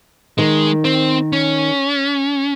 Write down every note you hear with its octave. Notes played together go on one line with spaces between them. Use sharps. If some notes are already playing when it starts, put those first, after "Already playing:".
D#3 G#3
C4
C#4